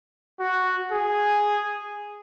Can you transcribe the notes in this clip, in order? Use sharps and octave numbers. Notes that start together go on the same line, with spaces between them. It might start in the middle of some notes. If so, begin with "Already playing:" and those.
F#4
G#4